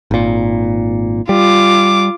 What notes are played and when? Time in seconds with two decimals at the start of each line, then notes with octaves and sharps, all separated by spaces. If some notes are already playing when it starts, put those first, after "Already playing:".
0.11 G#1 A#2
1.29 G3 F4 D6